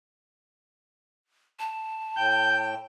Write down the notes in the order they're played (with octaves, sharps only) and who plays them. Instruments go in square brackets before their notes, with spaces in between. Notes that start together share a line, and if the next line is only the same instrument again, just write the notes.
[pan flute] A5
[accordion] A2 G5 [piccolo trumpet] G6